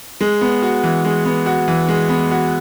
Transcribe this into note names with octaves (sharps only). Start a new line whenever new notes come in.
G#3
B3
F#4
E3
G#3
B3
F#4
E3
G#3
B3
F#4